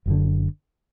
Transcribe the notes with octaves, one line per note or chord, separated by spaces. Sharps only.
F#1 F#2 D3